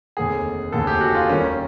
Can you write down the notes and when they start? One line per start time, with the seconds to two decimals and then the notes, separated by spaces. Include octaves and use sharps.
0.17 F1 D#2 D3 G#4
0.72 F1 D#2 D3 A4
0.87 G4
1.00 F#4
1.15 F4
1.28 D#2 D#3 G3 A#3 C#4